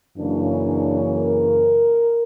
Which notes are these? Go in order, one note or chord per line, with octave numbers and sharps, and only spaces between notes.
F#2 C#3 E3 A#3 C#4 D4
D4
A#4